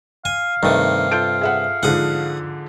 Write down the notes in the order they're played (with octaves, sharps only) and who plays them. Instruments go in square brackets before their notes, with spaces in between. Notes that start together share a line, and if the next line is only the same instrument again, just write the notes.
[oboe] F5 [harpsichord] G#5
[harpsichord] G2 C3 [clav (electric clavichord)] D#3 A3
[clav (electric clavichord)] F4 A4 [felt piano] G6 D7
[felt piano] G#4 E5 F#5
[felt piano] G#2 D3 F3 [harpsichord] G#4 F#5